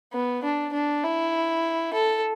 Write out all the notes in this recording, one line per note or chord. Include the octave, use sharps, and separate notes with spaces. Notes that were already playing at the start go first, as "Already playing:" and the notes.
B3
D4
D4
E4
A4